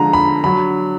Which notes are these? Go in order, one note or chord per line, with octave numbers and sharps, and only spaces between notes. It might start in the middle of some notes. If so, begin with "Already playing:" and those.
Already playing: D3 F3 G#3 A#5
B5
D3 F#3 B5